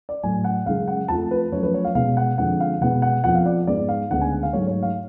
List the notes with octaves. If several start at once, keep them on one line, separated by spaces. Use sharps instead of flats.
D5
A2 F#3 A3 G#5
F#5
F#2 C#3 G#3 F5
F#5
F2 F3 A3 A5
B4
F#2 F3 A3 C#5
B4
C#5
F5
B2 G#3 B3 F5
F#5
F2 D3 G#3 F#5
F5
B2 G#3 B3 F#5
F#5
F2 F3 B3 F#5
F5
D5
G#2 G#3 B3 D5
F5
D2 C#3 G#3 B3 F#5
G#5
F5
G#2 F#3 A3 C#5
C#5
F5